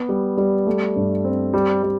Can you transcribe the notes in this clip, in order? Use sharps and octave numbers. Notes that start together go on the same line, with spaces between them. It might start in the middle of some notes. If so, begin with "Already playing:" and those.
Already playing: B3
G3
G3
A3
G2
C4
G3
G3